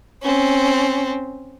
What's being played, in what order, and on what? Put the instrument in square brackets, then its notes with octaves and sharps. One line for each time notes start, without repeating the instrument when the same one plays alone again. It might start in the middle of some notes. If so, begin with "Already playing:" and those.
[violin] C4 C#4